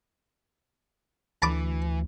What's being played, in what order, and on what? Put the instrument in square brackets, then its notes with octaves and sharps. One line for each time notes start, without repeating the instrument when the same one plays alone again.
[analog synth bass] D2 [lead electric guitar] E3 [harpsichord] A5 B5 D6